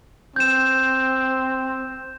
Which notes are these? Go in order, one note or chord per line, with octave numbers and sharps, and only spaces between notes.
C4 G6 E7